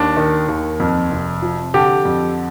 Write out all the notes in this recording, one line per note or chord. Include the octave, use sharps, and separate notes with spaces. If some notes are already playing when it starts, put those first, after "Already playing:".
Already playing: D#2 D4
D#3
D#2
F2
F1
F3
D3 G4
F2